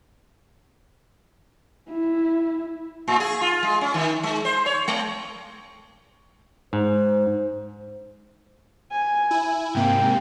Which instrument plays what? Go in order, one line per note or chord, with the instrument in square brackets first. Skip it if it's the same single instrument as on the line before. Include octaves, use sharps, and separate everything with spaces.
[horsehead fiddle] E4
[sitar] A2
G#4
F4
G#3
C#4
D#3
G#3
C5
C#5
G#3
[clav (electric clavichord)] G#2 [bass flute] C5
[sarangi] G#5
[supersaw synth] E4
[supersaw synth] G#2 C3 A#3 [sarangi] G5